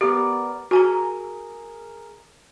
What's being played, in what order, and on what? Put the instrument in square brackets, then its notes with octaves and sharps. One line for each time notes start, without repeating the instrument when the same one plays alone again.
[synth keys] B3 A#4 D5 [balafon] G4
[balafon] F#4 G#5 A#5 [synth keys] G#4 A#4